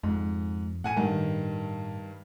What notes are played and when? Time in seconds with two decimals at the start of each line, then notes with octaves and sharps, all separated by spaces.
0.03 F2 G#2
0.84 A2 F#5 G#5 D#7
0.96 G2 D#3